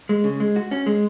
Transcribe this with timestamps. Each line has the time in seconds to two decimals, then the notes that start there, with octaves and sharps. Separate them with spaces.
0.09 G#3
0.24 C#3
0.40 G#3
0.56 F#4
0.71 C#4
0.86 G#3